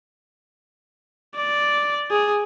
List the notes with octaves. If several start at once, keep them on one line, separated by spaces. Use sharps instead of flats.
D5
G#4